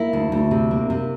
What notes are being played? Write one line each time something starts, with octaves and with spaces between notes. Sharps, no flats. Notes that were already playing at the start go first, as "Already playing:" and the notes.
Already playing: A#3 E4
D2
D2
C3
A#3
C3